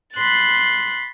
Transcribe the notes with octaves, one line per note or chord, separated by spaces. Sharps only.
B5 C6 F#6 A6